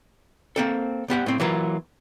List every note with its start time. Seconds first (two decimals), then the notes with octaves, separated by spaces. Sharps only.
0.56 A#3 C4 A4
1.08 C2 B3 G4 F#5
1.26 A2 C4
1.40 E3 F#3 A#3 F4